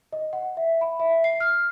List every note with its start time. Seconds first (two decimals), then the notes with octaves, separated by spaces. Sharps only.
0.13 D#5
0.33 F#5
0.57 E5
0.81 B5
1.00 E5
1.24 C7
1.40 F6